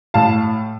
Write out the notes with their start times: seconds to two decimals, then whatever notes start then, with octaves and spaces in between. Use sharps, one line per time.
0.14 A2 F5 A5